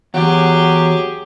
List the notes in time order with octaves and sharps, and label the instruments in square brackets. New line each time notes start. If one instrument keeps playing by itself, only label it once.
[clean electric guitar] E2 [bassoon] F#3 [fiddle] G4 G#4